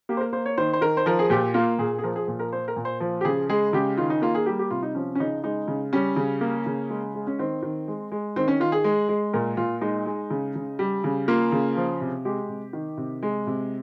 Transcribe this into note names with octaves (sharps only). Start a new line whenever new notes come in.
A#3 G4
C5
A#4
A#3 C5
C#5
D#3 C5
C5
D#3 A#4
C5
F3 A#4
G#4
A#2 G4
A#3 F4
A#2 G#4
G#4
F3 A#4
G#4
A#2
A#4
A#3 C5
A#4
A#2
C5
F3
G4
C#3 G#4
G#3 G#4
C#3 G4
D#3 F4
D#4
A#3 F4
G#4
G3 G4
G4
C3 F4
D#4
F3 C#4
C#4
C#3 D#4
G#3 D#4
C#3
G3 C#4
C#3
A#3
C#3
G#3
G#3
C#4
D#3 C4
D#3
G#3
G#3
D#3 C4
C#4
D#3 F4
G#4
G#3
G#3
A#2 A#4
A#2 F4
G#3 D#4
G#3
C#3
C#3
G3
C#3
A#3 F4
C#3
F3
C3
G#3 G4
C3
D#3
C3
G#3
C3